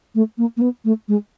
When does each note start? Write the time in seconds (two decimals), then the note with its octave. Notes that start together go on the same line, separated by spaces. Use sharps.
0.15 A3
0.38 A#3
0.57 A#3
0.61 B3
0.85 A3
1.08 G#3